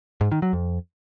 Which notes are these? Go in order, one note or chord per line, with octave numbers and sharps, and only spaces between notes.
G#2
D#3
F#3
F2